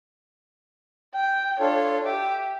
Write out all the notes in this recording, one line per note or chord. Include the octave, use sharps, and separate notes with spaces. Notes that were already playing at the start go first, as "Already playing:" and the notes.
G5
D4 F4 A4 C#5
G4 E5 D6